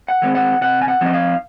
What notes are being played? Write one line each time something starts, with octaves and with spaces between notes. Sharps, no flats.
F#5
D#3 G#3 C4
F#5
C3 F#5
G#5
F#5
F3 C4 D#4 D#5
F5